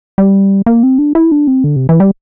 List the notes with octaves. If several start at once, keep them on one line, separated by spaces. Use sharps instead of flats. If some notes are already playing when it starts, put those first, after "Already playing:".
G3
A#3
C4
D4
E4
D4
C4
D3
C3
E3
G3